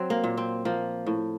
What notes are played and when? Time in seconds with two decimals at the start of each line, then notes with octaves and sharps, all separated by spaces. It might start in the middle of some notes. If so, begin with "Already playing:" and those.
Already playing: F#3 C4
0.10 A#3
0.24 A#2
0.37 C4
0.65 F3 A#3
1.06 A2